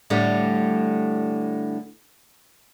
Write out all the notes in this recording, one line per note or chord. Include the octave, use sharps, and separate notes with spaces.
A2 D3 G3